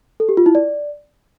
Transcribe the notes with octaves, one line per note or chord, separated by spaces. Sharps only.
A4
G4
F4
E4
D5